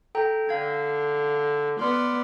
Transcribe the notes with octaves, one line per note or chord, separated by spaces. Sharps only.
A4 G5 A#5
D3 F5 G#6
B3 D5 C6 F6